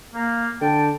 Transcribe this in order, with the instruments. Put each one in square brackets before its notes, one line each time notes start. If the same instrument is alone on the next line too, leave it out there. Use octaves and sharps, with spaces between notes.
[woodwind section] A#3
[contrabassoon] D3 [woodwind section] G5 A5